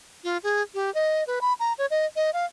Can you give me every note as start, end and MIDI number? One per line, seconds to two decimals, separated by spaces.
0.24 0.37 65
0.43 0.62 68
0.74 0.93 67
0.95 1.24 75
1.27 1.39 71
1.41 1.53 83
1.60 1.73 82
1.78 1.86 73
1.91 2.06 75
2.16 2.31 75
2.33 2.45 77